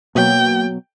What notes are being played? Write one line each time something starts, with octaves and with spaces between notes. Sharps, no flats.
B2 F#3 A#3 G5